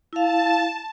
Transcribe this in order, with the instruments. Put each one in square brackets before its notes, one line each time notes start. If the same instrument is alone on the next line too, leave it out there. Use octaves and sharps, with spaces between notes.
[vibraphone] E4 F5 [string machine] A5